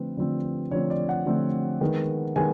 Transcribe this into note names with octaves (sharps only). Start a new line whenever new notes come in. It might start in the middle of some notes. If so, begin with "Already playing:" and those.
Already playing: D3 F3 A3 C4 B4
D3 F3 A3 C4
D3 F3 A3 C4 C#5
D5
F#5
D3 F3 A3 C4
D#3 G#3 B3
D#3 G#3 B3 G#5